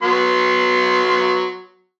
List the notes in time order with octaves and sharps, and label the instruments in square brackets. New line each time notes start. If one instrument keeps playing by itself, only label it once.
[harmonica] F#3 B3 C6